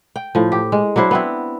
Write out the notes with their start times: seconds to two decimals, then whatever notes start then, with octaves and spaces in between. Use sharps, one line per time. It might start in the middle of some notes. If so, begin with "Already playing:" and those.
0.16 G5
0.35 A2 F3
0.52 G4
0.72 G#3
0.96 F#3 D4 E4 C5
1.11 B3 C4 E4